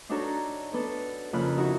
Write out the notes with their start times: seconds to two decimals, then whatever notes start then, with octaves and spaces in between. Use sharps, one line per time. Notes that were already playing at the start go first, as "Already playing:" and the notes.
0.09 D4 D#4 F#4 A4 C#5 A#5
0.74 B3 D4 A4
1.33 F2 C#3 A#3 A4 B5 F#6
1.58 D#4 E4 F#4